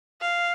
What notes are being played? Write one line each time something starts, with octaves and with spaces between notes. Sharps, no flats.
F5